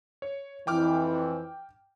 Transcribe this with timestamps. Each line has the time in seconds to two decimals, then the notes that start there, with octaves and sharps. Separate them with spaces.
0.22 C#5
0.67 F2 E3 G5 D6 F6